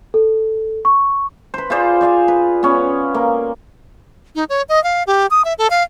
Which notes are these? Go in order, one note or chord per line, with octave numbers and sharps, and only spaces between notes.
A4
C#6
B4 C5
F4 G#4 C5 D5
C5 D5 F5 G#5
B4
B3 C#4
A#3
D#4
C#5
D#5
F5
G4
D#6
E5
A4
F5